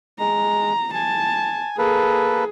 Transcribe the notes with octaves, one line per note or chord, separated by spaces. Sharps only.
G#3 A#5
G#5 A5
A#3 G#4 A4 B4